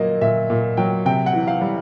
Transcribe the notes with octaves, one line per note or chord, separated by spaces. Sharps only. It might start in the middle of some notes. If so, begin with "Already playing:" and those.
Already playing: A#2 F#3 A#3 D#5
A#2 E5
A#2
F#3 G5
C3 G5
F#5
E3
F5
G3